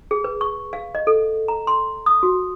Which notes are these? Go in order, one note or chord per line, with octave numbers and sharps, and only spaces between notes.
G#4
B4
C#6
F5
D#5
A4
A#5
C6
D#6
F#4